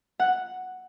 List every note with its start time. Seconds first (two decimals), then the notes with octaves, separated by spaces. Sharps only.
0.20 F#5